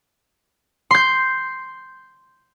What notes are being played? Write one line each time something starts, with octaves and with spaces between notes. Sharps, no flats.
C6 G6